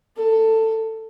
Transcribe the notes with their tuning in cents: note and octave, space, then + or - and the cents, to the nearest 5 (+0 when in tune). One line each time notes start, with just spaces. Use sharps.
A4 +15